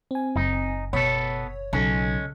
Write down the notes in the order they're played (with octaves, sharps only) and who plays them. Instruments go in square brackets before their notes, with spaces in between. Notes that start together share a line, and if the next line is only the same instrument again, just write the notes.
[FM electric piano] C4 G#5
[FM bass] F#1 [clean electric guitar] D#4
[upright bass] B2 [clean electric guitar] B3 A4 [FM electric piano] C#5
[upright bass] B1 [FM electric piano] C#3 A4 [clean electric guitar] G#3 C#4